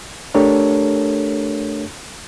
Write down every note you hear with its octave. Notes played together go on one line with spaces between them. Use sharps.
A3 D4 G4 A4 A#4 C#5